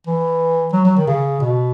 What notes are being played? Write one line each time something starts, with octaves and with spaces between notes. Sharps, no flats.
E3
F#3
F#3
D#3
C#3
B2